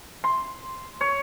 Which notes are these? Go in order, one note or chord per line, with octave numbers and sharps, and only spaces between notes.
C6
C#5